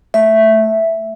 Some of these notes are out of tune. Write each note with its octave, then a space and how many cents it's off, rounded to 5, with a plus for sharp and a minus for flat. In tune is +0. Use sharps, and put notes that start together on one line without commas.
A3 +0 E5 +0